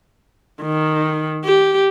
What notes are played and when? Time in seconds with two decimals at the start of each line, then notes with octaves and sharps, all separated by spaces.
0.61 D#3
1.44 G4